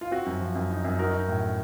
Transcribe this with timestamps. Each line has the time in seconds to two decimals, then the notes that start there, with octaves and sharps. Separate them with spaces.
0.01 F4
0.11 C4 F#4
0.26 F#2
0.41 F3
0.56 F#2
0.70 D#4
0.85 F#2
0.99 D#4 F#4 A#4
1.13 D#4
1.28 A2
1.43 A3